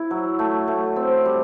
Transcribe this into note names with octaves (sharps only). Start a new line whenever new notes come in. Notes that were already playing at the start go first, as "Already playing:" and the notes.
Already playing: E4
F#3
A3
A3
C4
G3